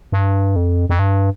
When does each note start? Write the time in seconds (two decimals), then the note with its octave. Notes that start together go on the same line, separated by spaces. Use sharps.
0.12 G2
0.56 F2
0.89 F2
0.99 G2